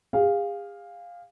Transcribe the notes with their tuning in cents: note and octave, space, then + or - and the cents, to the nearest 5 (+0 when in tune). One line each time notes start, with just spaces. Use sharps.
G#4 -40 F5 +5